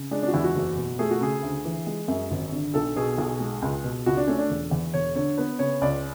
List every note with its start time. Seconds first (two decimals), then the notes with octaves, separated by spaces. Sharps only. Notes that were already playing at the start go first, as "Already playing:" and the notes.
Already playing: C#3
0.11 G#3 D4
0.23 D4
0.28 F#4
0.34 E2 E4
0.44 F#4
0.55 F#1
0.77 B2
0.99 A3 G#4
1.11 F#4
1.21 C#3 G#4
1.43 D2
1.65 E3
1.87 G#3
2.08 F#2
2.31 G#1
2.52 D3
2.74 B1 A4
2.96 B2 G#4
3.18 B1
3.40 G#3
3.62 C#2
3.84 B2
4.06 C#2 F#4
4.17 D4
4.27 A3 C#4
4.39 D4
4.50 E1
4.71 E2
4.93 E1 C#5
5.15 D3 C#5
5.37 B3 B4
5.59 C#3 C#5
5.81 C#2 D5